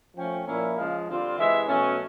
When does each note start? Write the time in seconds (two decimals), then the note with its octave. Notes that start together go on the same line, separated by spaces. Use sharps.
0.15 F3 A3 C#4 G5
0.46 A#2 F3 A#3 C#4 E4
0.76 C#3 F3 G#3 F5
1.08 D3 G3 C4 F4
1.38 C3 E3 G#3 E5
1.68 B2 F#3 A3 C#4